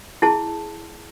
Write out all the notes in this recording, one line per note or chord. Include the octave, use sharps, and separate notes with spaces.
E4 G#4 A5